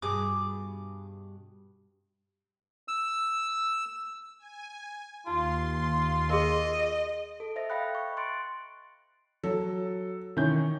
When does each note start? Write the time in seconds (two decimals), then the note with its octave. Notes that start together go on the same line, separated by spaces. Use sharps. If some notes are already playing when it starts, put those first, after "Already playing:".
0.02 G2 B2 G#4 D6
2.88 E6
4.38 G#5
5.27 D#2 D#4 F4 C6
6.30 G#4 A#4 D#5
7.40 A4
7.56 C5 D#5 E5 A#6
7.70 D#5 F5 G5 B5 F#6
7.95 C#6
8.17 C6 F#6 A6 C#7 D7
9.43 F#3 A4
10.37 D#3 E3 C#4 G6